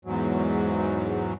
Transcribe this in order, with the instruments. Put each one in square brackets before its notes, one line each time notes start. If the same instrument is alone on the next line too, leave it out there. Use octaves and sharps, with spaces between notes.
[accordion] E2 G#2 F#3